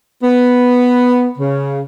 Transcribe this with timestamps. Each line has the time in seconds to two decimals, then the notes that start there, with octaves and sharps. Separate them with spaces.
0.23 B3
1.38 C#3